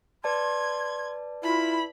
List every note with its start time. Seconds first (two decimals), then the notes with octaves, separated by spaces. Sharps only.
0.24 B4 D5 A5 C6 G#6
1.44 E4 F4 B5